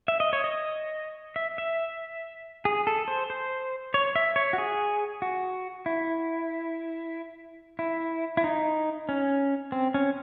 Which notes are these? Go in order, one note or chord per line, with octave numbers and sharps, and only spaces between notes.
E5
D#5
C#5
D#5
E5
E5
G#4
A4
C5
C5
C#5
E5
C#5
F#4
G#4
F#4
E4
E4
E4
D#4
C#4
C4
C#4